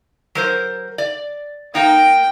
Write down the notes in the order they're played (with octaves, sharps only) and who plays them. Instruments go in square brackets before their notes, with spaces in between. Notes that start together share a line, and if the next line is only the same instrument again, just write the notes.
[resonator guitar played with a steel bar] F#3 A#4 C5
D5
[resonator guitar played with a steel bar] A#3 D#4 [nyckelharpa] G5